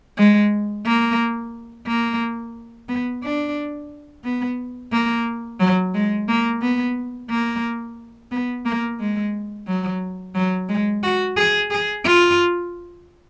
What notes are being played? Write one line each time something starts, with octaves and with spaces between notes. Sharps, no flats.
G#3
A#3
A#3
B3
D4
B3
A#3
F#3
G#3
A#3
B3
A#3
B3
A#3
G#3
F#3
F#3
G#3
F#4
G#4
G#4
F4